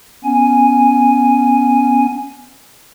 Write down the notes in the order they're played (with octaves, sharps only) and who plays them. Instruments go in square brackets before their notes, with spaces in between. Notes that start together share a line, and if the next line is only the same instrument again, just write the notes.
[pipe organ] B3 C#4 G#5